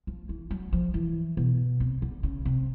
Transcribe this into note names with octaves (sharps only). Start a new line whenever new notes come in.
F3
E3
F#3
F3
E3
B2
C3
D3
C#3
C3